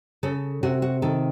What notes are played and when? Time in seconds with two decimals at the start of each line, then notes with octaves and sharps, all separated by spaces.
0.23 C#3 A4
0.63 C3 F#4
0.82 F#4
1.02 D#3 A4